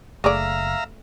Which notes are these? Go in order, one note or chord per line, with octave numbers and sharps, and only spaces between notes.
F#1 A3 G#4 D5 E5 F5 A#5